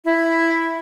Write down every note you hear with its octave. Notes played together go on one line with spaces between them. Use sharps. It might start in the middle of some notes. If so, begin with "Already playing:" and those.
E4